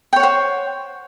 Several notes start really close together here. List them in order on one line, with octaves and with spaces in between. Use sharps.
G5 C#5 F#5 C5